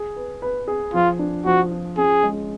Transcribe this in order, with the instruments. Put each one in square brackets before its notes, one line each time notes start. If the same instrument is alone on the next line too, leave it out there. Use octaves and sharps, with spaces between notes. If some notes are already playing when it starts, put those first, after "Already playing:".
Already playing: [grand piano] G#4
B4
B4
G#4
[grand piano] F3 [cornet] F4
[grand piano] D4
[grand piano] F3 [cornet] F#4
[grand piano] F4
[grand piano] C#4 [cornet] G#4
[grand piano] G#3